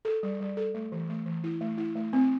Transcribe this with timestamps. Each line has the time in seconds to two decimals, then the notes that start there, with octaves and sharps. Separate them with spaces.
0.05 A4
0.23 G3
0.40 G3
0.57 A4
0.74 A3
0.92 E3
1.10 A3
1.26 E3
1.44 E4
1.61 A3
1.77 E4
1.96 A3
2.13 C4